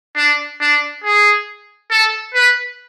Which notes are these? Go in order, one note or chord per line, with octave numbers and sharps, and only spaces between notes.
D4
D4
G#4
A4
B4